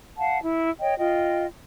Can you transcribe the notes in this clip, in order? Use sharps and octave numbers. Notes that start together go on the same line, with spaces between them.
F5 F#5 A5
E4
C#5 D#5 G5
F4 D#5 G5